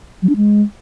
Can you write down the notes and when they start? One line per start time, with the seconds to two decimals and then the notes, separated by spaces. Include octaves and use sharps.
0.22 F#3
0.29 D4
0.36 G#3